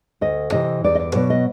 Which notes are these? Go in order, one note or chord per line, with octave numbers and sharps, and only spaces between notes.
D2 D#5
C3 E3 D#5
E2 D5
D#5
D5
B2 F#3 D5
D#5